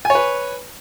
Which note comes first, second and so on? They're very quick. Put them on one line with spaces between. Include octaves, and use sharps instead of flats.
G#5 C#5 B4